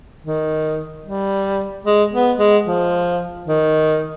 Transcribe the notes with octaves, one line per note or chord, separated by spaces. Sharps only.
D#3
G3
G#3
B3
G#3
F3
D#3